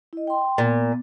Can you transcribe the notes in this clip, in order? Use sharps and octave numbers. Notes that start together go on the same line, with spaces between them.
E4 D#5
G5 C6
A#2 B3